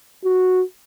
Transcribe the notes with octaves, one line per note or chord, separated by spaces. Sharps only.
F#4